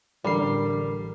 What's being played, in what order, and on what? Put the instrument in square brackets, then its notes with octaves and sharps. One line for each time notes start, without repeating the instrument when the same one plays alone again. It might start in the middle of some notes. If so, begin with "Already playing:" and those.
[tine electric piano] A1 A#4 C7 [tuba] D3 [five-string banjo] G3